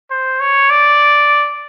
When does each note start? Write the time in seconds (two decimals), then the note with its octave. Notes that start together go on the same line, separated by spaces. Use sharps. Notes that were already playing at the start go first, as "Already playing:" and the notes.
0.10 C5
0.40 C#5
0.70 D5